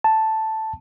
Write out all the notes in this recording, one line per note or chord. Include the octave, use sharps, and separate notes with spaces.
A5